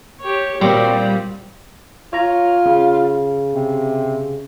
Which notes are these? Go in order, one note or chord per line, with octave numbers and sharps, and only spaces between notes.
G4 C#5
A#2 G3 C4 F#4 G4
F4 C#5 A#5
C#3
C3